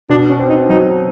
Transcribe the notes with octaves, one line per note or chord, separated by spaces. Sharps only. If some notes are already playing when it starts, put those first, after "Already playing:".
B2 D4
C#4
C4
D#4
F#3 D#4